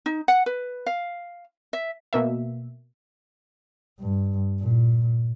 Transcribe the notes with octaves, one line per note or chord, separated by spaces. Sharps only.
D#4
F#5
B4
F5
E5
B2 A#3 E5
G2
A#2